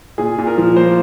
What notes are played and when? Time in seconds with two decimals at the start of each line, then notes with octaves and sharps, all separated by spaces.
0.18 A#2 G#4
0.38 A#2
0.47 A#4
0.58 F3
0.76 A#3 C5